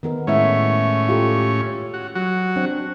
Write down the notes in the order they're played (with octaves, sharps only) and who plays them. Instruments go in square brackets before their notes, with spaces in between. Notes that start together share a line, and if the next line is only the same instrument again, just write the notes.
[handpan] D#3 B3 A#4
[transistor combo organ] A2 C#4 [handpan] G#3 E4 E5
[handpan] F4 G4 A4
[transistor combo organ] F#4
F#3 F#4
[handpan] C4 D4